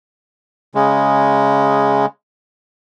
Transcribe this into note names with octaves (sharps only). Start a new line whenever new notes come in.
C#3 G#3